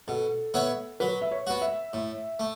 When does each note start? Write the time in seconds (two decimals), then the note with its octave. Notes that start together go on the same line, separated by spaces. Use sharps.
0.08 B2 A4
0.54 B3 E4 C#5
1.00 F#3 B4
1.22 E5
1.31 C#5
1.47 B3 F#4
1.62 E5
1.93 A2
2.40 A3